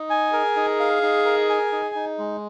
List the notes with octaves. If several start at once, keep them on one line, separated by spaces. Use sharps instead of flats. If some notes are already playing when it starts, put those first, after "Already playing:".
Already playing: D#4
G#5
G#4 A#4
D#4
F5
D#4
A#4
G#5
D#4
D#4
G#3